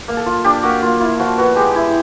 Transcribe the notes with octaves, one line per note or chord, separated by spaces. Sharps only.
A#3
A4
F4
D4 G4
A#3 F#4
A#3 F4
E4 F4
F3 F#4
B3 F#4
G#3 G4
E4